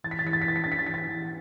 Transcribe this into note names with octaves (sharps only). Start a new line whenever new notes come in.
E2 A6
B6
A6
E2 B6
A6
B6
E3 A6
B6
D4 A6
B6
A6
E2 B6
A6
E2